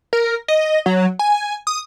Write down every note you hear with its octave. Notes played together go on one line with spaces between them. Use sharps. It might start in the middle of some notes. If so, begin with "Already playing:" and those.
A#4
D#5
F#3
G#5
D#6